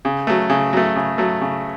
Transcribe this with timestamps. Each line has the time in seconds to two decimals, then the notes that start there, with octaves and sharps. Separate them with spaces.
0.05 C#3
0.27 F#3 A3
0.50 C#3
0.73 F#3 A3
0.96 C#3
1.18 F#3 A3
1.41 C#3